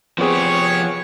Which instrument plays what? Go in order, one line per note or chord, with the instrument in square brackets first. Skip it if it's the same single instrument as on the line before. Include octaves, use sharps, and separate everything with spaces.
[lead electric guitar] F3 G4 [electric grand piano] B3 C4 G#4 [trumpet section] C#5